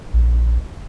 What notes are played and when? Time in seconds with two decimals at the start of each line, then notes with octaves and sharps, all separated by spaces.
0.13 A#1